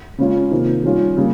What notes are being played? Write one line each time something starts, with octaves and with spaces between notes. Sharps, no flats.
C#3 G#3 C#4 F4
C3 D#3 A#3 F4
D#3 G3 C#4 F4
C#3 G3 A#3